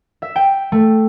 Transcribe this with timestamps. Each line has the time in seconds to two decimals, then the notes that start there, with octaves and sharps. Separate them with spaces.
0.22 E5
0.36 G5
0.72 A3